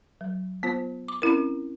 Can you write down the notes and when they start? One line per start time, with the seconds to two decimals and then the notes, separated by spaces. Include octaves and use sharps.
0.21 F#3
0.63 B3 F4 C5
1.08 D6
1.22 C4 C#4 E4 A#4